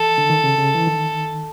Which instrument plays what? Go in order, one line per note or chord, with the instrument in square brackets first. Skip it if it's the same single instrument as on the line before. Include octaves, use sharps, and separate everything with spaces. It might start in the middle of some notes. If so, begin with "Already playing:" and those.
Already playing: [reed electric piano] E3 [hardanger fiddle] A4
[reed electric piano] D3
D#3
C#3
C#3
E3
D#3